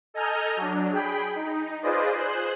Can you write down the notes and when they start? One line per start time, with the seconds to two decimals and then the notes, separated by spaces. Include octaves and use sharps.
0.14 A4 D#5 G#5 A#5 F6 G6
0.56 F#3 D4
0.91 G#4 G5 B5
1.36 D#4
1.82 F4 G#4 B4 C5 D5 D#5
2.16 G#4 C5 F#6